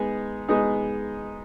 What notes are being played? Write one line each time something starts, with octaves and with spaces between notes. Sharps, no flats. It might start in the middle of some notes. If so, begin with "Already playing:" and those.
Already playing: G#3 B3 D#4 G#4
G#3 B3 D#4 G#4